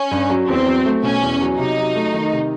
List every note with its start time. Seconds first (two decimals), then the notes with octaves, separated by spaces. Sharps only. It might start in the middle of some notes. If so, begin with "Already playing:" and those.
Already playing: C#4
0.11 G2
0.29 F#3
0.48 E2 C4
0.66 F#3
0.85 A3
1.03 B2 C#4
1.22 E2
1.41 F#3
1.58 C3 D#4
1.78 F#3
1.95 A3
2.14 D#3
2.33 C3